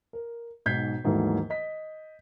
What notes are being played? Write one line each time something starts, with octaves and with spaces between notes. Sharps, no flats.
A#4
B1 G#2 G6 G#6 B6 C7
D#2 G#2 E3 F#3 A3
D#5 B6